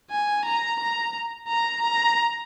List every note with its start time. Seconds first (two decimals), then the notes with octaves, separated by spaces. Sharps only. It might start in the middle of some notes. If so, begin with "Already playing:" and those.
0.11 G#5
0.45 A#5
0.80 A#5
1.48 A#5
1.82 A#5